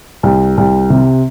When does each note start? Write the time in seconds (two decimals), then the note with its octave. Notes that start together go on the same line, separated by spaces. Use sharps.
0.23 C2
0.58 C2
0.90 C3